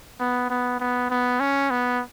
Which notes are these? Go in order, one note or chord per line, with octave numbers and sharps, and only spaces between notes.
B3
B3
B3
B3
C#4
B3